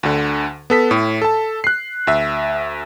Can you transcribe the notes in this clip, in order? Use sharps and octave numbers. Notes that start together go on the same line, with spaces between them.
D2 D3
B3 A4 B6
A2
A4 A5
F#6 C7
D2 E5